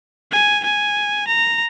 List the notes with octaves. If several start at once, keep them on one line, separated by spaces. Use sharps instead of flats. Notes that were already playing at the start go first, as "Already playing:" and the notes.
G#5
G#5
A#5